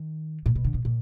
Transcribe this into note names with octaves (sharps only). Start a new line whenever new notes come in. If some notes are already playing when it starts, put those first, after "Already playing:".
Already playing: D#3
A#2
B2
D3
B2
A#2